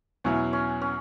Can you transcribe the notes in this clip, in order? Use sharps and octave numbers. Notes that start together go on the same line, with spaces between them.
E2 B2 F#3 C#4 E4
C#4
C#4